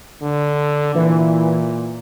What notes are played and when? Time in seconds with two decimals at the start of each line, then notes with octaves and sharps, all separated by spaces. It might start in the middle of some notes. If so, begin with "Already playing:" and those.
0.22 D3
0.95 A#2 E3